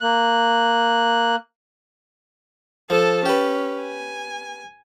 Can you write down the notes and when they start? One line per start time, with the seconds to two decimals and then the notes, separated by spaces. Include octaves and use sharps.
0.01 A#3 F#6
2.90 F3 A4 A5
3.26 C#4 G4 B4
3.82 G#5